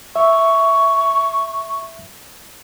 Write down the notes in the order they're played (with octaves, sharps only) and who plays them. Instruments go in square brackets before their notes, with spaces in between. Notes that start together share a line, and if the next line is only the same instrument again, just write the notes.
[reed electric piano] E5 [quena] C#6